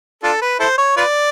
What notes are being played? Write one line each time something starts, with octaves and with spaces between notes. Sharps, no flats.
D4 F4 A4
B4
E4 A4 C5
C#5
F4 B4 D5